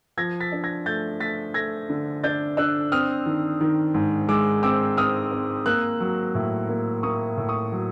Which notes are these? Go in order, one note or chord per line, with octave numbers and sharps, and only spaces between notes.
F3 G#6 A#6
A6 B6
D4
G#6 A#6
A3 G6 A6
A3 A6 B6
A3 G#6 A#6
D3
D4 G6 A6
D4 E6 F#6
C4 D#6 F6
D#3
D#3
G#2
G#3 D6 E6
C4 D6 E6
C4 D#6 F6
C4
A#3 E6 F#6
F#3
A2
A#3
A#3 C#6 D#6
A2
C#6 D#6
F#3